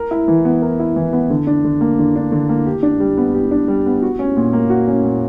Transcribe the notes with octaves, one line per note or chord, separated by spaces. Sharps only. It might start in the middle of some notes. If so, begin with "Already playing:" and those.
Already playing: A#4
E4
E3
B3
A#4
E4
E3
B3
D3
D4
D3
A#3
D3
D4
D3
A#3
G4
D4
G3
B3
G4
D4
G3
B3
F#4
C#4
A#2
A#3
F#4
C#4
A#2